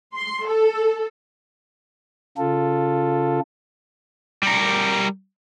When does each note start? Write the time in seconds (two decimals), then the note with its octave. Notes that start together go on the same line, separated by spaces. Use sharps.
0.15 C6
0.47 A4
2.37 C#3 F4 A4
4.43 G3 A#4